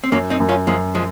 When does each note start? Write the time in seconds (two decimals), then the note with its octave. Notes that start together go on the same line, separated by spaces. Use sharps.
0.04 C4
0.12 F#2 F#3 A#3
0.30 C4 D#4
0.40 F#2
0.49 C#4 F4
0.67 F#2 F3 G#3
0.95 F3 G#3